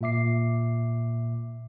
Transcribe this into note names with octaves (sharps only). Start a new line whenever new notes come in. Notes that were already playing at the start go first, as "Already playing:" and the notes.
A#2 A#3 E5 D6 C7